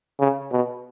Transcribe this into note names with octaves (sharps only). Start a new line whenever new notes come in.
C#3
B2